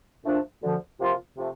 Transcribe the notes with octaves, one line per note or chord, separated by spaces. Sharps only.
A#2 F3 A3 D4
D2 D3 F3
C3 F3 A#3 F4
C3 F3 A3